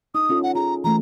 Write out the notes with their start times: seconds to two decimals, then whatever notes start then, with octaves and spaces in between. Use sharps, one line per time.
0.15 D#4 D#6
0.30 C#4 F4 A4
0.43 F#5
0.55 F4 G#4 A#5
0.84 E3 A3 A#5